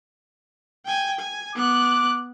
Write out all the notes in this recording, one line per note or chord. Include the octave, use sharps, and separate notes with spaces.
G5 G#5
G#5
B3 D6 F#6